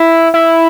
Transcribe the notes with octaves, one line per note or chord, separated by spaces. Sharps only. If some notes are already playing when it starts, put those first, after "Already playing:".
Already playing: E4
E4